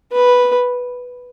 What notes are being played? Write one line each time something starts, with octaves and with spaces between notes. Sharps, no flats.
B4